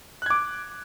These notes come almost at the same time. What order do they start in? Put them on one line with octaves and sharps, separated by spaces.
F#6 G#6 D6